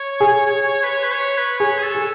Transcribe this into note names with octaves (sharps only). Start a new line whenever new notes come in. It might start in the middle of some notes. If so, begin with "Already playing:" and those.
Already playing: C#5
G#4
B4
C#5
B4
C#5
B4
G#4 C#5
G#4
A4
G#4